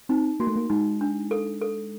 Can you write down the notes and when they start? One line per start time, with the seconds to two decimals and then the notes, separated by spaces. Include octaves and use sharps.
0.09 C4 D#4
0.40 A#3 F#4
0.47 A3
0.56 A#3
0.70 G#3 D#4
1.01 D4
1.31 A4
1.61 A4